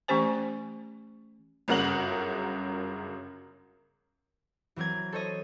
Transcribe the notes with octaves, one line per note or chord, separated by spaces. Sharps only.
E3 A3 C#4 G4 C5 G#5
G1 F#2 C#3 A#4 F#5 F#7
E3 F#3 C4 A#4 G#6
A4 C5 C#5 D#5